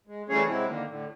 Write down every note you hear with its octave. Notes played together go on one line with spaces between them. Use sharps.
G#3
E3 G3 A3 C#4 G#4 C#5
C3 F#3 G#3 C4 E4
D3 D#3 A#3
A2 D3